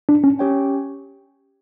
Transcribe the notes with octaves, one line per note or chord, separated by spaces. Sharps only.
D4
C#4
C#4 G4 C#5 G5